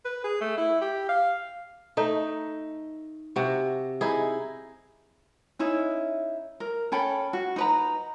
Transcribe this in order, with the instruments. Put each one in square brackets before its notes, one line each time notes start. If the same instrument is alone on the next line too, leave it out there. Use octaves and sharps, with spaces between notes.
[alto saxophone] B4
G#4
A3
E4
G4
F5
[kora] A3 D#4
C3 F#4
D#4 E4 G#4
[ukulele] C#4 D#4 E4 E5
A#4
C#4 A4 G5 B5
F#4
D#4 B4 A#5